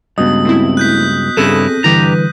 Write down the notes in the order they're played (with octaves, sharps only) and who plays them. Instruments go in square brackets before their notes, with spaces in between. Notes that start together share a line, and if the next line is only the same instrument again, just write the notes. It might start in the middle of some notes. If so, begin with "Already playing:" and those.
[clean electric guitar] C#2 G2 [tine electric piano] B3 F#4 D#5 [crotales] D#6
[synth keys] A3 C4 E4
[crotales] F#6 G6 B6
[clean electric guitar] G2 C#3 E4 [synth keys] C4 G#4 A4 [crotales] A#6 D#7
[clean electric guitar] G2 G4 A#5 [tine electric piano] D3 E3 G3 [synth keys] B4